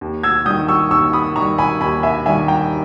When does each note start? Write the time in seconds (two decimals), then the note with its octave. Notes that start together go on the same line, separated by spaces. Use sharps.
0.01 D#2
0.23 E6 G#6
0.46 D#3 G3 D#6 G6
0.68 C#6 E6
0.91 D#2 C#6 E6
1.13 B5 D#6
1.36 D#3 G3 A#5 C#6
1.58 G#5 B5
1.81 D#2 G#5 B5
2.03 E5 G#5
2.26 D#3 G3 E5 G#5
2.48 G5 A#5